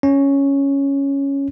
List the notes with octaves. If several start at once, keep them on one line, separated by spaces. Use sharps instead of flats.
C#4